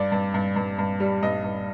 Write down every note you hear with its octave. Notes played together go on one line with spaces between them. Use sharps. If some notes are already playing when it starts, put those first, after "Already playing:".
Already playing: G2 D5
G2
G2
G2
G2
G3
G2 D#5
G2